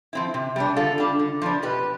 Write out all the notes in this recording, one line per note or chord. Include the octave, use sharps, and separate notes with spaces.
F3 C4 E4
C3
G3 B3 D4
D3 F4 A4
G3 D4
D3
F3 B3 D4
B2 G4 B4